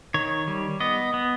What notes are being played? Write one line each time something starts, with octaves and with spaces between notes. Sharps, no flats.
D#3 C#5
G3
B3 D#5
B3